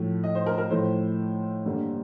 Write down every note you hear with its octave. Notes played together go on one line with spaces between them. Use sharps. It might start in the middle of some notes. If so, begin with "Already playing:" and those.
Already playing: A2 F3 A3
D#5
C5
A#4
A#4
A2 F3 A3 C5
G2 D3 G3 A#3